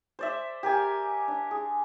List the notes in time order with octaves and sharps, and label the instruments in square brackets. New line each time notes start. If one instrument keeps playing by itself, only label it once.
[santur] C5 D5 E5
G4 A#4 G#5
D4
G#4